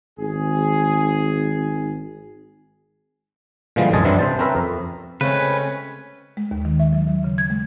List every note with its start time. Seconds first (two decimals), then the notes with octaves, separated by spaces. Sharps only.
0.19 G#1 G#4
3.76 A#2 D3 E3 F3 G3 G#3
3.93 C2 F#2 G#3 D#5 G#5 A5
4.05 G2 E3 F#3 C4 D4 E4
4.19 C3 C5 A5
4.39 C4 C#4 A#4 B4 E5
4.55 F2
5.21 C#3 G#3 A3 C4 C#4 B4
6.37 G#3
6.51 D#2
6.65 D#3
6.80 E5
6.93 F#3
7.07 F#3
7.24 C#3
7.38 G#6
7.50 G#3